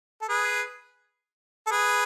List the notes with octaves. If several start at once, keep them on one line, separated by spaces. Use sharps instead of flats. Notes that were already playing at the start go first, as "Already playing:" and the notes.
A4
G#4 B4
A4
G#4 B4